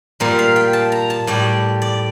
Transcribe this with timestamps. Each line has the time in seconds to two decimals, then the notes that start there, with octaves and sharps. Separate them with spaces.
0.20 A#2 G3 A#4
0.39 F5
0.56 G5
0.73 A5
0.92 A#5
1.10 A5
1.27 A2 G3 D5
1.82 D5